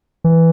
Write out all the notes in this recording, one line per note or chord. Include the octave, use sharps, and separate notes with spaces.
E3